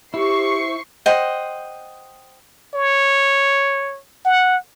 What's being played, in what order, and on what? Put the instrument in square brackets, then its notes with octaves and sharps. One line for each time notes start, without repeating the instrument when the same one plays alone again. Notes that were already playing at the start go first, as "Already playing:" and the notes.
[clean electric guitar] E4 [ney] G4 [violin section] C5 C#6 C7
[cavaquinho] C5 D#5 F#5 G5
[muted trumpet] C#5
F#5